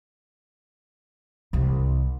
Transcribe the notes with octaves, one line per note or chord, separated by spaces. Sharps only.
C2 C3